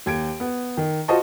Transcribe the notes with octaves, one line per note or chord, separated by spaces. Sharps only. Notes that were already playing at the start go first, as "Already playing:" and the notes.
D#2 G#6 D7
B3
D#3
F4 F#4 C5 D#5 A5 C#6